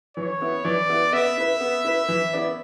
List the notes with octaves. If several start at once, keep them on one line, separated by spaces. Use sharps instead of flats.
E3 C#5
B3 E4
E3 D5
B3 E4
B3 E5
E4 B4
B3
E4 B4
E3
B3 E4 B4 D5